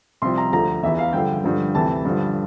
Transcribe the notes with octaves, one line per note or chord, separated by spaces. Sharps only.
C2 C3 F3 C6
A#5
D2 D3 F3 A#5
E2 E3 E5
F5
G2 D3 F3 G5
G2 D3 F3
D2 C3 E3 A5
G2 D3 F3